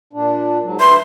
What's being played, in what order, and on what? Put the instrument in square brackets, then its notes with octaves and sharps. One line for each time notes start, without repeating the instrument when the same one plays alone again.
[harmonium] A#2 D4
G#2 F#3
[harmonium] D2 B4 E5 [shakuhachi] C6